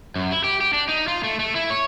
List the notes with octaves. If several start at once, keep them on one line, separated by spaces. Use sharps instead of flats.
F#2
E4
G4
G4
D4
D#4
F4
A3
A3
E4
C#5